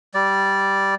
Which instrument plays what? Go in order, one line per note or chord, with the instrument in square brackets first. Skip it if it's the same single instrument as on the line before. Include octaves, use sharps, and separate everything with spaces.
[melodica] G3 D5